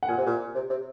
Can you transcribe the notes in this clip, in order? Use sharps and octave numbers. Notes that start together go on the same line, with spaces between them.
F#5
A#2 G#5
C3
A#2
C3
C3